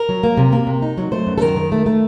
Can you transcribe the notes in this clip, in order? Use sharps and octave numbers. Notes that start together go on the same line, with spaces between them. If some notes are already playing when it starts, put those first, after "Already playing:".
Already playing: A#4
F#3
A#3
C3
A#3
C3
D#4
F#3
A3 C5
F#2
A4
D#3 A#4
D#3
A3
A3